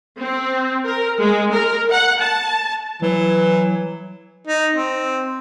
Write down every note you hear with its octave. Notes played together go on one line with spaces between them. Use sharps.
C4
A#4
G#3
A#4
F#5
A5
E3 F#3
D#4
C4